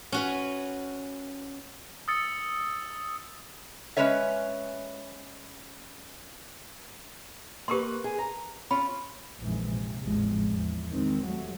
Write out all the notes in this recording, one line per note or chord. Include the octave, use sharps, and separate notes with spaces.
C#4 F#4 B4
D#6 E6 A6 C#7
G#3 C#4 B4 C#5 E5
A#3 G4 A#4 B4 C6
G#4
A#5
C#4 F4 B5
A#1 F2 D#3 E3 G#3
C3
A1 E2 C3 F3 G#3
E2
D#3 G#3 C4
F#3 G3 A3